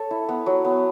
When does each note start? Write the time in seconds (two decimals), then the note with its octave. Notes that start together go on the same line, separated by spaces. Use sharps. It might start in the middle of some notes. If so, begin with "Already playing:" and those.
Already playing: A4 C#5
0.11 E4
0.29 B3
0.46 F#3
0.65 B3